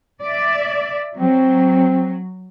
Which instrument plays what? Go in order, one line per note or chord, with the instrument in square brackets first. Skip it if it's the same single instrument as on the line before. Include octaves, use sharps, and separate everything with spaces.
[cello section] D5 E5
[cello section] F#3 [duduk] C4